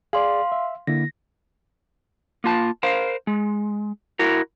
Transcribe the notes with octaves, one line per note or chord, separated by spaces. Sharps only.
G#4 D5 F5 C6
E5
D3 A#3 E4 A#6
A#3 F4 A5
A#4 C5 F5
G#3
E4 F#4 A#4